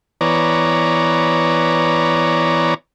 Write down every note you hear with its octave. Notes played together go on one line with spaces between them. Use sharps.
E3 B3 C#5 D5 A#5